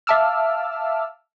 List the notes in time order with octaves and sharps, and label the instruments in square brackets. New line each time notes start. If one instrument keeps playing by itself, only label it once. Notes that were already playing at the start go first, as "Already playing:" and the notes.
[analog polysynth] E5 F5 A5 D6 E6 F6